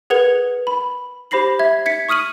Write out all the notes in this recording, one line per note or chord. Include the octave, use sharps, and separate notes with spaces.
G#4 A#4 B4 F#5 G#6 F7
B5
G4 C5 B5 A#6 C7 F#7
E5 G#6
G#6 B6 C#7
C#6 D#6 F6 D#7 F#7